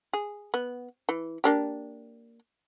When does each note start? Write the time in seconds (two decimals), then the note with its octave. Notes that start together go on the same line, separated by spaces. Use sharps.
0.13 G#4
0.54 B3
1.09 E3
1.44 A#3 D4 G4